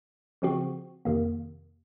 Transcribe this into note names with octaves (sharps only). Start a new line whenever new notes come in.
C#3 F3 C4 F#4
F2 C3 D#3 A#3